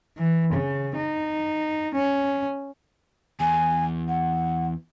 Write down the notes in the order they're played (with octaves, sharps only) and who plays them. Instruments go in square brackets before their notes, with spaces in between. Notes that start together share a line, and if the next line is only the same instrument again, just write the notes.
[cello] E3
C#3
D#4
C#4
[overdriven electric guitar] E2 [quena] G#5
[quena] F#5